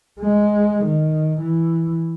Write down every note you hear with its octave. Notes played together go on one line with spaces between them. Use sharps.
G#3
D#3
E3